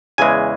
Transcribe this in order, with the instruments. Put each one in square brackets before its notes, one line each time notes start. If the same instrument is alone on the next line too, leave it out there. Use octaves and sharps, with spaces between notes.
[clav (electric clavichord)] E2 C#3 E3 G#3 G#5